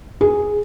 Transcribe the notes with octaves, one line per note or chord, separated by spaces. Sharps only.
G#4